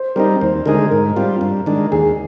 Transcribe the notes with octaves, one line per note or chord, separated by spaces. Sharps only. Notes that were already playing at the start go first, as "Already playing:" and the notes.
Already playing: C5
G3 C4 D#4 A#4
D#2 C5
D3 G#3 D#4 G#4 A#4
G#2 A#4
G3 C4 F4
G2
D#3 G#3 D4
D#2 G#4